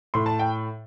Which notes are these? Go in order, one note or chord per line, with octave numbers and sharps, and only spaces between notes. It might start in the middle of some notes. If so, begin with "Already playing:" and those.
A2 C6
A5
G5